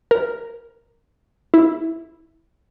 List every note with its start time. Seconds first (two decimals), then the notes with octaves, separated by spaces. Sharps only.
0.11 A#4
1.54 E4